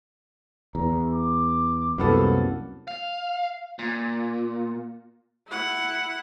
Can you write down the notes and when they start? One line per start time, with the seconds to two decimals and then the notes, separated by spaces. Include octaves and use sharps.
0.75 E2 A#5
1.13 D6
1.98 C2 F#2 A#3 B3 A4
2.88 F5
3.79 A#2
5.48 E4 F#5